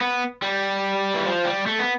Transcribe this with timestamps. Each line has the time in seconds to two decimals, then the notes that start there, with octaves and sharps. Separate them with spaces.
0.01 B3
0.42 G3
1.15 E3
1.26 F3
1.45 G3
1.66 A3
1.79 B3